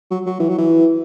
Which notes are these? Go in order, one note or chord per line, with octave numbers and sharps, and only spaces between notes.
F#3
F#3
E3
F#3
E3